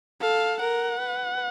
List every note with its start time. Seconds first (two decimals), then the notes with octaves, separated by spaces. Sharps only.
0.21 A4 F5
0.60 A#4 F#5
0.99 B4